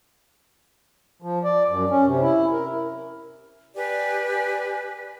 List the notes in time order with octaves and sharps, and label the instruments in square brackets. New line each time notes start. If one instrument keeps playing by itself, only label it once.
[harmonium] F3
D5
F#2
C#4
C3
E4
A#4
[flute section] G4 B4 D5 G#5